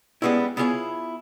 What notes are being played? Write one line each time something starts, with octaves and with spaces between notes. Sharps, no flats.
G3 G#3 B3 C#4 E4
B3 E4 F4 G4 G#4 C#5